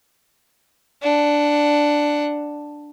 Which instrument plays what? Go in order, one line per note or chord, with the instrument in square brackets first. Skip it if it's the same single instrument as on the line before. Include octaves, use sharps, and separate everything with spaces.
[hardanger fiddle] D4 F#5